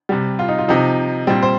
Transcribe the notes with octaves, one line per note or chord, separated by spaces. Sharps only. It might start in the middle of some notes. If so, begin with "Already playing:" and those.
C3 G3
F4
D#4
F4
C3 F3 D#4
A#2 G3 C4
C5